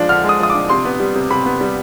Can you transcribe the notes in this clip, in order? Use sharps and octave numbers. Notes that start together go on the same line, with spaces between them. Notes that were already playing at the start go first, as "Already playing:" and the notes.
Already playing: F3 G#3 D4
D3 F6
G#3
D#6
F3 D#6
D6
D4
C3 C6
B3
G3
C3
C3 B5
B3
G3